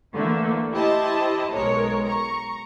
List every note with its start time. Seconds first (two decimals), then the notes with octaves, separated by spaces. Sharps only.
0.12 D3 E3 A3 A#3
0.72 E4 G4 C5 D#5 A5
1.52 B1 G#3 A#4 C#5
2.04 A#5 C#6